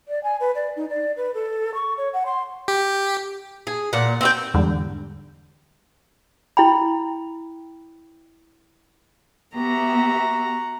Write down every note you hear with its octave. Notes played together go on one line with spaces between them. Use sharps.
D5
G#5
B4
D5
D#4
D5
B4
A4
C#6
C#5
F#5
C6
G4
G#4
A#2 F#5
C4 F#4 G5
E2 G#2 D3 G3
E4 G5 B5
B3 F#4 G4 E5 A#5